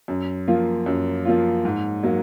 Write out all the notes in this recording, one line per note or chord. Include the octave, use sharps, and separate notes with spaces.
F#2
F3 A#3 F4
F#2
F3 A#3 F4
G#2
F#3 A#3